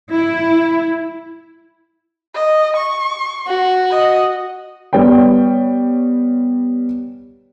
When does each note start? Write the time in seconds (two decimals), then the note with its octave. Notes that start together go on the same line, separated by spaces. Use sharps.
0.12 E4
2.35 D#5
2.76 C#6
3.47 F#4
3.91 D#5
4.93 G3 B3 C#5 G5